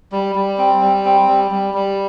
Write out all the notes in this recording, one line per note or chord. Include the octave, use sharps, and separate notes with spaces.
G3
G3
C4
G3
C4
G3
G3
G3